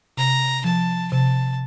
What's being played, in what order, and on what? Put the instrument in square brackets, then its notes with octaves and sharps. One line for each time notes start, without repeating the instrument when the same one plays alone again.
[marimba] C3 [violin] A#5
[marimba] F3 [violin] A5
[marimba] C3 [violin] A5